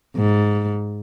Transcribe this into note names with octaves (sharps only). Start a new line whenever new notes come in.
G#2